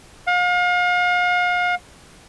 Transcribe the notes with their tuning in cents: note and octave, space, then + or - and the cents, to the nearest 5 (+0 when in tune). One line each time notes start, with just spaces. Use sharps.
F5 +40